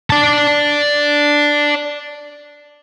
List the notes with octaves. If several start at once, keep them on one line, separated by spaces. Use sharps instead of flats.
D5 A5